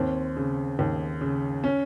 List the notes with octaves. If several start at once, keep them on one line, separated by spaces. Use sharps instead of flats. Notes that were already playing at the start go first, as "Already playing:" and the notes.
Already playing: D#2 C4
C#3
D#2
C#3
C#4